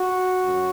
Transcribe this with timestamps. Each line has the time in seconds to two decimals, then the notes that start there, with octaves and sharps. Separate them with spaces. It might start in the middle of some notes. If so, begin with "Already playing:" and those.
Already playing: F#4
0.42 F#2